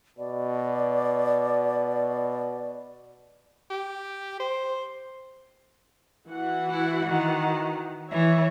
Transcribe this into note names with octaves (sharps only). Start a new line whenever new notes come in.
B2 D5
G4
C5
E3 F#4 F#5
E4
D#3
E3 C#5 E5